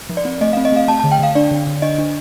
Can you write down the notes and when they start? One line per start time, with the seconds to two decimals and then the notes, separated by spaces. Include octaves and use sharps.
0.09 F3
0.17 D5
0.25 C4
0.41 A3 D#5
0.53 C4 F5
0.65 D#5
0.72 A3 F5
0.88 A3 A5
1.00 D3 A5
1.12 G5
1.19 D3 F5
1.35 D4 D5
1.51 D3
1.67 D3
1.82 D4 D#5
1.98 D4